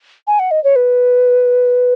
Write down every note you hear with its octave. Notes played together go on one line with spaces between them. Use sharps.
G#5
F#5
D#5
C#5
B4